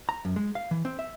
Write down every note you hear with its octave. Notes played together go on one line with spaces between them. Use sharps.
A#5
F#2
G#3
F5
E3
C4
E5